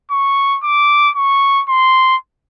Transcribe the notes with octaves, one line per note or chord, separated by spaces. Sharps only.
C#6
D6
C#6
C6